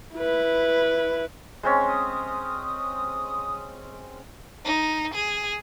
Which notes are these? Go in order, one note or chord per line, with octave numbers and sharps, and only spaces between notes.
E4 B4
G#3 C4 C#4
D#6
D#4
G#4